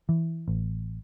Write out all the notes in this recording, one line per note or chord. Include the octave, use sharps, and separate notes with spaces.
E3
A1